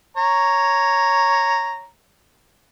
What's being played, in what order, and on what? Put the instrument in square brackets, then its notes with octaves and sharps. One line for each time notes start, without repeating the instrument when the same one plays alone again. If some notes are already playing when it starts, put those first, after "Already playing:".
[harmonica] C#5 A#5